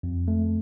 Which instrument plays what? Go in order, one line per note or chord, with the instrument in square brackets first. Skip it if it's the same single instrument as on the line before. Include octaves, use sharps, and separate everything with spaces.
[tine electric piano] F2
A3